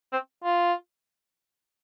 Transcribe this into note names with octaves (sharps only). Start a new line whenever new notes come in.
C4
F4